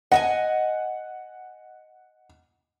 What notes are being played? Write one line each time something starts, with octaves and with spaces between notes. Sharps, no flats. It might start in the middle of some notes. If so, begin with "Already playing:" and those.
D#5 E5 F#5 G#5